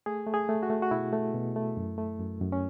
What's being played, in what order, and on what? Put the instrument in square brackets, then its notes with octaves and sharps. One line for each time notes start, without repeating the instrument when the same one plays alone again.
[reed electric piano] A3 G#4
A3
G#4
A3
F#4
A3
F#4
B2 E4
A3
B2
A3
F#2
A3
F#2
F#2
C#4